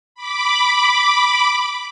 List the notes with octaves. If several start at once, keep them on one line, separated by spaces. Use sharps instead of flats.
B5 D6